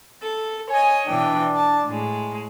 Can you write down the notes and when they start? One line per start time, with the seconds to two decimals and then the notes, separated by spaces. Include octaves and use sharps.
0.22 A4
0.70 C#5 D#5 G#5
1.07 B2 E3 D4 G5
1.56 A5
1.85 A2 G#3